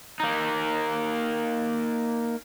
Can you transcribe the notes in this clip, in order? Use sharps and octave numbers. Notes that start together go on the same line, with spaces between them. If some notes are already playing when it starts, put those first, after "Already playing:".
A#3 D#4